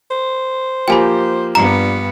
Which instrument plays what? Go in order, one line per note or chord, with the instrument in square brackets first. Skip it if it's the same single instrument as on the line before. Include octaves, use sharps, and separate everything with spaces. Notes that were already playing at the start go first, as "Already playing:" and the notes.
[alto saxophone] C5
[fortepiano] F3 A#3 G4 [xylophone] G5 G#5 B5
[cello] G2 B3 [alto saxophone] D4 [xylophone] A#5